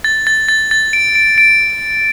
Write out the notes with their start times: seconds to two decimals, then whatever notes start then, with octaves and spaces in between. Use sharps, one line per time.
0.04 A6
0.27 A6
0.49 A6
0.71 A6
0.93 D7
1.15 D7
1.38 D7